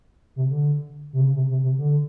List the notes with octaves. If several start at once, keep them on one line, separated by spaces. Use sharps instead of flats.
C3
D3
C3
C#3
C3
C3
C3
D3